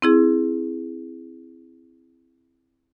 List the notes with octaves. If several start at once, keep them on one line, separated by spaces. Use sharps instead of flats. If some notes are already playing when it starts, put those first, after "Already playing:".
C4 E4 G#4